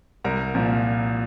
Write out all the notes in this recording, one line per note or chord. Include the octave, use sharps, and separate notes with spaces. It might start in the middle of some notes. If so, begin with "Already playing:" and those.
C2 A#4 A#5
A#2 F3